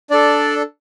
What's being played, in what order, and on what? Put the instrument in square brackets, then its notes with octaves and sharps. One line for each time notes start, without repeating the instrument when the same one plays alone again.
[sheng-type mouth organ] D4 A4 D5